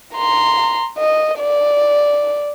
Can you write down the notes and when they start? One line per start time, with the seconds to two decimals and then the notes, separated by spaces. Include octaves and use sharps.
0.15 A#5 C6
0.99 D#5
1.40 D5